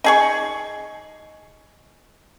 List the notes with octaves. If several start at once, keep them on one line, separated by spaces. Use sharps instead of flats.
D#4 G#4 C#6